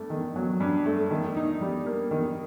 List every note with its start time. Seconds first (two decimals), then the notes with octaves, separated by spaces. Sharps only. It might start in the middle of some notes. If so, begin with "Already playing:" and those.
Already playing: G2 A3
0.10 D#3
0.36 F#3
0.60 G2
0.85 A3
1.10 D#3
1.36 D#4
1.61 G3
1.86 A#3
2.11 D#3